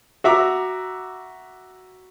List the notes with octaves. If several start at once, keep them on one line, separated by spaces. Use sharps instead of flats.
F#4 E5 A#5 D6